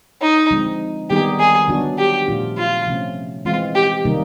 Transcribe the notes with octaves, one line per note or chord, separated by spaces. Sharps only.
D#4
D3 F3 G#3 C4 D#4
D#3 G3 B3 D#4 G4 G#4
G#4
D3 F#3 B3 D4 F#4
G4
A#2 F3 A3 D4 F4
F4
C3 F3 A3 C#4
E3 G#3 C4 F4
G4
C3 D#3 G3 A#3 D#4